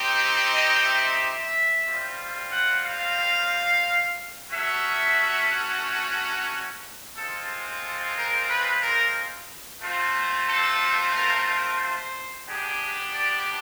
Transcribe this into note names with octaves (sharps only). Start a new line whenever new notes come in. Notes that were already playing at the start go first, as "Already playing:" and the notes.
Already playing: C4 D#4 G4
D#5
E5
G3 C4 F4
F#5
F5
A3 C#4 F#4 E5
G#3 C4 F4 A4
A4
A#4
B4
A#4
A3 C4 F4
A4
A#4
A#4
C5
B3 D4 G4 G#4
D5